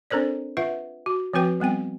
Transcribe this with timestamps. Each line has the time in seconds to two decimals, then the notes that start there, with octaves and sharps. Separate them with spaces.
0.10 C4 D4 A4 A#4 C5 D5
0.57 F4 B4 E5 F#5
1.06 F#4
1.33 F3 C4 F#4 B4 G5
1.60 G3 B3 C4 G5